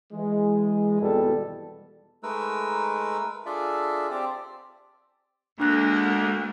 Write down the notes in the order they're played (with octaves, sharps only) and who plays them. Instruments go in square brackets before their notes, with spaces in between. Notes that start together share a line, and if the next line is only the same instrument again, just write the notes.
[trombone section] E3 G#3
G#1 E2 B2 G3 A4
[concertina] G#3 A3 D#4 A#4 B4 E6
D4 F4 G#4 A4 D5 E5
C4 G4 C5 D5
[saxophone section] D2 [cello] G#3 A#3 [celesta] D4 F#6